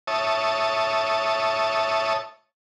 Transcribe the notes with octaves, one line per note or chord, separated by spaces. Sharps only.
C#5 E5 A5 D#6